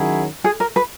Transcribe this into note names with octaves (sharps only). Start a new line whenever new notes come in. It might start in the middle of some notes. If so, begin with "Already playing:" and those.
Already playing: D#3 F#3 C#4 E4 G#4
G#4
A#4
B4